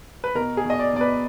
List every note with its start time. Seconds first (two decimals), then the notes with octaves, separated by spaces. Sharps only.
0.24 B4
0.35 B2 A#4
0.57 G#4
0.65 B2
0.70 D#5
0.79 D5
0.94 B2 D5
1.01 B4